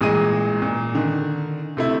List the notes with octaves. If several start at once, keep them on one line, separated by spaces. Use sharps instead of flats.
A1 A#2 G#3 G#4 D#5 D#7
A#2
D3 D#3
C3 A3 E4